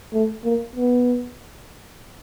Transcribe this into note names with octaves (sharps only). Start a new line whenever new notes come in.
A3
A#3
B3